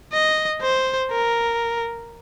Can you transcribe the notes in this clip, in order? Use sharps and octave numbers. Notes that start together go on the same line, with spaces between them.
D#5
C5
A#4